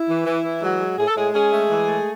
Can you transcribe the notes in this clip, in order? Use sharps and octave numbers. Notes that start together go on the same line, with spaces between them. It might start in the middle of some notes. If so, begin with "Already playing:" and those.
Already playing: E4
E3
E3
E3
F#3 G#3 F#4
G#3
A2 G#4
A4
A2 G#3 G#4
G#3 C#4 G#4
A3
E3
A3